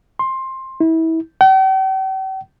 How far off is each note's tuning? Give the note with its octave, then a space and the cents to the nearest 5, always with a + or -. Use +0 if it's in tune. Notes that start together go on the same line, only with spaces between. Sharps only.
C6 +15
E4 -30
G5 -45